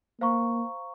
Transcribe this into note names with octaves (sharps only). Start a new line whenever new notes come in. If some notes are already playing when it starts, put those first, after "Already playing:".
A#3 C5 F5 A#5 C#6